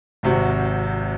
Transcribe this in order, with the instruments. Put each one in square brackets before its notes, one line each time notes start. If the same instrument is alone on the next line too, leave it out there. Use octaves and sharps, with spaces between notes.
[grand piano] G#1 C3 F#4